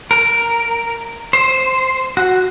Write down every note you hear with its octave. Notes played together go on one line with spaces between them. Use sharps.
A#4
C5
F#4